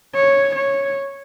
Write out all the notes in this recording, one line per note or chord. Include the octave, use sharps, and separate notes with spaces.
C#5
C#5